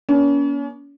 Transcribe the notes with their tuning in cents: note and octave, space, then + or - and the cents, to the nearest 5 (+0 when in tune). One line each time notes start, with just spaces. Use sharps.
A#3 +45 C#4 +35